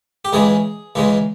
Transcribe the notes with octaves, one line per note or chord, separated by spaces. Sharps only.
G4
C#2 C#3 E3 G#3 G#4
C#2 C#3 E3 G#3